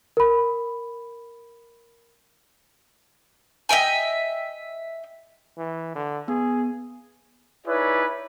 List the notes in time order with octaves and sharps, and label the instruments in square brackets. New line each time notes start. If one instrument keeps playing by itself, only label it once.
[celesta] A#4 B5
[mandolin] D#5 E5 G5 G#5
[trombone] E3
D3
[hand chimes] B3 [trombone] G#4
[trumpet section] D#4 E4 G#4 B4 C#5 D5